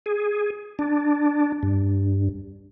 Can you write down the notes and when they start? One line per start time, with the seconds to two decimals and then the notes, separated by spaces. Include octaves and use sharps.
0.06 G#4
0.79 D4
1.63 G2